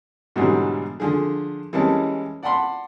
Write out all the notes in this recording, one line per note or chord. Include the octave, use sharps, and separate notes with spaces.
G#2 B2 D3 E3 F#3 G3
D3 F3 G#4
E3 G3 G#3 A#3 C#4 A5
D5 F#5 A5 B5 C6